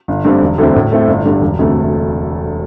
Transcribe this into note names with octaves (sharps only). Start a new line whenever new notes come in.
G1
G2 D3 A3 C4
E1
D2 D3 C4 E4
A2
A3 C4 E4
G1
G2 D3 G3
E1
D2 C3 A3